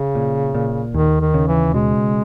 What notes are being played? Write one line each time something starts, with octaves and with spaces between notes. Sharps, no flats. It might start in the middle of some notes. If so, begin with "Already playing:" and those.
Already playing: C#3
A#2
A#2
D#2 D#3
D#3
C#3
E3
B2 G#3